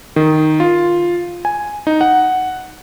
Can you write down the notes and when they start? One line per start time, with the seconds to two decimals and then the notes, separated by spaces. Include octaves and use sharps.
0.16 D#3
0.60 F4
1.45 G#5
1.87 D#4
2.01 F#5